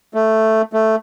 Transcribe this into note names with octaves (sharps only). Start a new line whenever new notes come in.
A3
A3